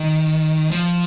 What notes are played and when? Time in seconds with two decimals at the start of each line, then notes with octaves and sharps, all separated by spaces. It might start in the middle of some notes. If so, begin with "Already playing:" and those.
Already playing: D#3
0.71 F3